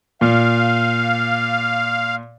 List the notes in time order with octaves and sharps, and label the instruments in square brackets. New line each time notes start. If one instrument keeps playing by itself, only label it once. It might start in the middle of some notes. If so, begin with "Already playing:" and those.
[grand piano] A#2 [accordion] F5